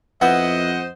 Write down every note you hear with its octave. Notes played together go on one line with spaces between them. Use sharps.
F2 B3 E4 C5 D#5 F#5